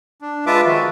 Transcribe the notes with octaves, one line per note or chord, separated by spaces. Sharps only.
D4
G#3 F4 B4 E5 A5 D6
D#3 F3 G#3 F#4